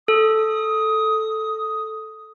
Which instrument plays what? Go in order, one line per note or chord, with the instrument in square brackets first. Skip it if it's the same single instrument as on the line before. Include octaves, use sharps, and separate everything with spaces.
[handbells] A4 [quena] D#6